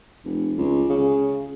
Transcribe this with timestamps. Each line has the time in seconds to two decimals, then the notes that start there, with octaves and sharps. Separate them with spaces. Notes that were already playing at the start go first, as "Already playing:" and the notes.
0.25 F1
0.57 C#2
0.90 C#3